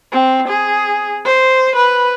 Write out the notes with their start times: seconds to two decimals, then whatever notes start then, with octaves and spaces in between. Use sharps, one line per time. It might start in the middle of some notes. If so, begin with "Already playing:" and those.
0.12 C4
0.48 G#4
1.25 C5
1.76 B4